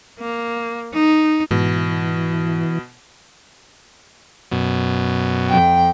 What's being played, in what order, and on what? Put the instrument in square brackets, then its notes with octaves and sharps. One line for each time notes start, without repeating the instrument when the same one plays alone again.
[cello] A#3
D#4
[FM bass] G#2 [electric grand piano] B2 [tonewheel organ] E3
[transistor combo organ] F#2 B2
[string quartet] F2 G5